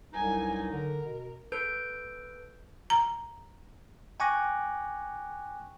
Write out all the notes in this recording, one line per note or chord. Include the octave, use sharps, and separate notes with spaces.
C2 G2 F#3 D#4 G#5
D3 A#4
B2
A4 B4 G6 D7
A#5
G5 G#5 C#6 D6 F#6 A#6